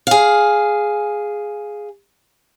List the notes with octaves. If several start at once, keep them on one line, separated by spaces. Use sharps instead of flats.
G#4 F5